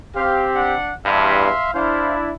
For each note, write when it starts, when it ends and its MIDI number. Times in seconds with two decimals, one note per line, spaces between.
0.16 0.73 60
0.16 0.73 67
0.16 0.45 72
0.16 0.45 77
0.55 0.94 62
0.55 0.94 78
1.06 1.50 40
1.06 1.50 43
1.06 1.72 76
1.06 1.72 77
1.06 1.72 84
1.75 2.32 62
1.75 2.32 64
1.75 2.16 72
1.75 2.16 77